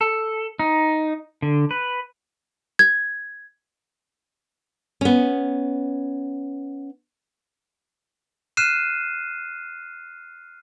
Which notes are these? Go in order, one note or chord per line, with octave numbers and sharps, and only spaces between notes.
A4
D#4
D3
B4
G#6
B3 C#4
F6 F#6 C7 D#7 E7